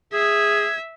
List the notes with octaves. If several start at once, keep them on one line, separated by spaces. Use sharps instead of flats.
G#4 E5 G#6